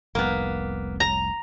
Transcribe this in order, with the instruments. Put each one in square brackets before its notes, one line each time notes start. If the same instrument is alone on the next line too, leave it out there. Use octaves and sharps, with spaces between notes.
[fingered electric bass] F1 C2 [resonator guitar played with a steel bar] A#3 B3
[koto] A#5